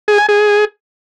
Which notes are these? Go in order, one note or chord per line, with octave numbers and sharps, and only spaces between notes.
G#4
G#5
G#4